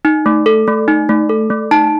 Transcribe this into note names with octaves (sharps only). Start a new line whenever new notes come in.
D#4
A3
A4
A3
D#4
A3
A4
A3
D#4 A5